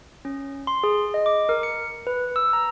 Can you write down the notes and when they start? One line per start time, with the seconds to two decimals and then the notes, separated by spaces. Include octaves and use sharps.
0.25 C#4
0.67 C6
0.84 G#4
1.14 D#5
1.26 D6
1.49 A#4
1.63 C#7
2.07 B4
2.36 E6
2.53 A#5